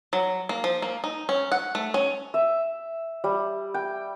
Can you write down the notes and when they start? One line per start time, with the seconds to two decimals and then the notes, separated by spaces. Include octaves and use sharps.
0.13 F#3
0.49 A#3
0.64 F3
0.82 A#3
1.04 D#4
1.29 C#4
1.52 F#5
1.75 A3
1.94 C#4
2.34 E5
3.24 G3
3.74 G5